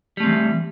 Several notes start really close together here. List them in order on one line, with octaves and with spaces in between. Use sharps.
G3 A3 C4 E3